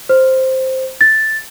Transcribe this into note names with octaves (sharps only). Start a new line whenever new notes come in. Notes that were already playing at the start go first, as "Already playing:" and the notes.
C5
A6